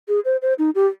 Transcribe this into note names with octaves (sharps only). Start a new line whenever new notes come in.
G#4
C5
C5
D#4
G4